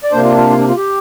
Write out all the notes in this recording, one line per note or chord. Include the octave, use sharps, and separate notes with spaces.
D5
C3 A#3 D4 C5
F4
F4
F4
D4
F4
G4